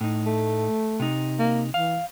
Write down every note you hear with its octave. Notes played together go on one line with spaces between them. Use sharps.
A2 D#4
A3
C3 D#4
A#3
E3 F5